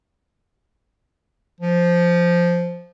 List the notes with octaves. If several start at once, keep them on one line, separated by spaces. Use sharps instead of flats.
F3